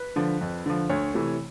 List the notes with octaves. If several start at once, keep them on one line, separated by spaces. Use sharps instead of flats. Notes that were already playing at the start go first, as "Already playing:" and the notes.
Already playing: B4
D3 F3
F2
D3 F3
D2 C#5
C3 E3 A3